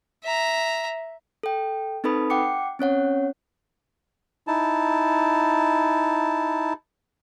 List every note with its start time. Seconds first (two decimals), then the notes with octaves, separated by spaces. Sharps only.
0.23 E5 A#5
1.43 A4 G5
2.04 C4 D#4 A4 B4 B5 D#6
2.30 F#5 G5 D6 C#7
2.79 C4 C#4 C#5 F#5
4.47 D#4 E4 A5